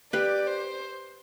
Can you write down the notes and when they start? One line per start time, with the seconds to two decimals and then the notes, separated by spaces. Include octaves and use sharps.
0.13 G4 B4 D5
0.47 C5